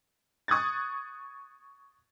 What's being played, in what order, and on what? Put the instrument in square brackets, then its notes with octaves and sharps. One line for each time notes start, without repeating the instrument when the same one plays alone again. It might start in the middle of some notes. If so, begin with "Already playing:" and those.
[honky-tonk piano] C#6 D#6 F#6 G#6 A6